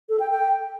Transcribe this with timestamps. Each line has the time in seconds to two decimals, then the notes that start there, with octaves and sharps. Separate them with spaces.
0.09 A4
0.20 G5
0.30 G5